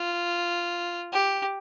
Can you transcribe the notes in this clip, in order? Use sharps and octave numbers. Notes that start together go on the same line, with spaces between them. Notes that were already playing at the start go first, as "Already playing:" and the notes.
Already playing: F4
G4